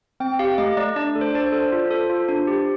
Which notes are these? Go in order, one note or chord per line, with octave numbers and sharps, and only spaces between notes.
C4 G5
G4 F5
A3 D#5
A3 D5
D4 D5
A4
C5
D4 D5
C5
A4
F4
A4
F4
D4
G4